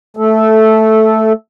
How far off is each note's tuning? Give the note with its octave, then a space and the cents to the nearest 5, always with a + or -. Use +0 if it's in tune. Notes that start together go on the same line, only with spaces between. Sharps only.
A3 +0 A4 -10